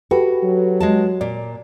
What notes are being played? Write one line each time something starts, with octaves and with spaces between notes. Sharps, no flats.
F#4 G4 A4 B4
F#3
G#3 D#5 A5
A#2 D5